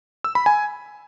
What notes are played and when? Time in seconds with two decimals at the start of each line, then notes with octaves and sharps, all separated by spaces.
0.24 E6
0.35 B5
0.46 G#5